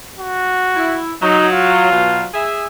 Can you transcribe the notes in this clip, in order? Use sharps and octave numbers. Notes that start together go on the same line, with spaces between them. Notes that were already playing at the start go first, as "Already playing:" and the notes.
F#4
E4
F#3 D#4
F4
B2 F#3
G#4 E5